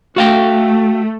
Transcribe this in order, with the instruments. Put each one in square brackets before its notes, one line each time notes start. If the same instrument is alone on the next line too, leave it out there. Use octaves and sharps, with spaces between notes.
[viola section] A3 [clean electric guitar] F#4 F5 G5